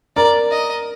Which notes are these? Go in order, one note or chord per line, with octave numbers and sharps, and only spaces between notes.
A#4 D5 A#5
D#5